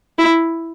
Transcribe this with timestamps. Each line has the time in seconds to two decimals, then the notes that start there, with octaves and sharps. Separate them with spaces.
0.18 E4